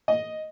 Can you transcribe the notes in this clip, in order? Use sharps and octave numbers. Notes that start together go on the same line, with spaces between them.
D#5